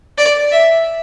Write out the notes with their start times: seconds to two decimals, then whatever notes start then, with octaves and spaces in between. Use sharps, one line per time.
0.18 D5
0.52 E5